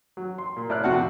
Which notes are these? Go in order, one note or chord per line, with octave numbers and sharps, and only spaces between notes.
F#3
C6
A#2
A2 D5 F6 F#6
F2 C3 F#4 F#5 A5 F#6